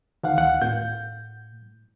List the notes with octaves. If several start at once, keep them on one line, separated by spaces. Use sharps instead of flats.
D2 D#3 F5 F#5
D2 F5 F#5
A2 G6